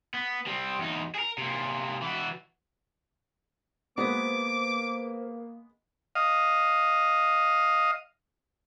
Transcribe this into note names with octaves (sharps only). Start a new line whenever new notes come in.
B3
G3 C4
E2 D#4
G#4 A#4
C3 A#3
E3 F#4
G#3 A#3 B3 F#4 G#4 B4 C5 D6
D#5 F5